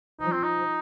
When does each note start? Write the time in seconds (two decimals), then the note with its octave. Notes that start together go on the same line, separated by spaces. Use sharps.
0.20 F3 D#4
0.32 C4
0.43 D#4